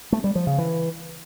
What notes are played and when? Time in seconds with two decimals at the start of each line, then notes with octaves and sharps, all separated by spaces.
0.12 A3
0.24 G3
0.35 F3
0.47 C#3
0.58 E3